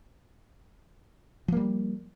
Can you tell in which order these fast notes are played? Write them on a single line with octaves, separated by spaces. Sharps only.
F3 A#3 G3